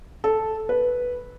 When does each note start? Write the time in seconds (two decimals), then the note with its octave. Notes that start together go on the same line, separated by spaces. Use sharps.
0.24 A4
0.69 B4